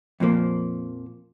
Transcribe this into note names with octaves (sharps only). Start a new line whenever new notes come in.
F2 A#2 F3 A#3